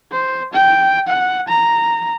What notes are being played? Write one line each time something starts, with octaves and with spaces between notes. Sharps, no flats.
C5
G5
F#5
A#5